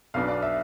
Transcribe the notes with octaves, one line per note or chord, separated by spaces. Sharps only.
B1 B2 B3 D4 F5
D5
E5